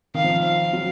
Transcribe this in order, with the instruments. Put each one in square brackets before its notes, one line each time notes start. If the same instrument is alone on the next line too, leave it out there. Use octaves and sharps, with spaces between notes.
[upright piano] D#3 [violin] F5
[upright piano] F3
[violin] F5
[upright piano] F#3